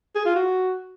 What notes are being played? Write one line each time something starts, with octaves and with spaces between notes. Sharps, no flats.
G#4
F4
F#4